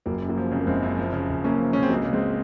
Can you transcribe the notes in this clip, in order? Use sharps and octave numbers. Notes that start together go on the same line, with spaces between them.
F#1 F#3 A#3
F#2
F#3 A#3
F3
C#3 C4
A#3
F#1 G#3 C4
F#2
F3
C#3
F#1
F#2 A#3 C#4
F3
C#3 C#4
C4
C#2 F#3 A#3
C#3
G#3 C4